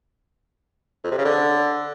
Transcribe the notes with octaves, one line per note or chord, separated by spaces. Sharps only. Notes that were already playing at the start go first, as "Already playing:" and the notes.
F2
C3
C#3
D3